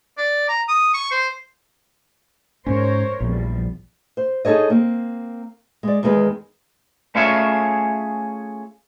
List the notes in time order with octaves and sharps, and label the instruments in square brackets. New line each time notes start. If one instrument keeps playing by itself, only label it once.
[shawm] D5
A#5
D#6
C#6
C5
[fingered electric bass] G#2 C#4 [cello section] A#4 C5 C#5
[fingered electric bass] A#1 [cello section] E2 F3 G3
[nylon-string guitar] C5
D#4 G#4 A4 C#5 D#5
A#3 C4
G#3 D5
E2 D#3 G#3 G#4 B4
[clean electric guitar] A3 C#4 F4 G#4 C#5 E5